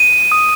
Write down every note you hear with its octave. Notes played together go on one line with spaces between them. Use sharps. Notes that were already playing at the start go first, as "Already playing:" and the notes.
Already playing: D#7
D#6